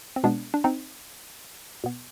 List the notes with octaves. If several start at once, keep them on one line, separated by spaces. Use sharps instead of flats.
C4
B2 G#3 B3 D4
D4
C4 D#4
B2 B3